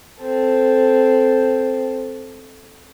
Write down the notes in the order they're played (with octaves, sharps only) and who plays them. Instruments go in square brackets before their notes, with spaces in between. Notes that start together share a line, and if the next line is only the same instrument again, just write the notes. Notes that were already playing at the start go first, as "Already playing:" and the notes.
[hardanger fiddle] C4 A4